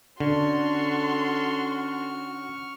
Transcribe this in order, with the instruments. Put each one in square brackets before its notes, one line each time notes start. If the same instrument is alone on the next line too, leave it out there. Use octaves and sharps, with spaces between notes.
[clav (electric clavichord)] D3 [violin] C#4 F#4 [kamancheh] A4 C6 [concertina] C#6 F6